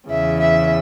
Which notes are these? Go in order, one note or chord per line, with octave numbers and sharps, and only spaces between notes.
E2 C#3 E3 E5
E5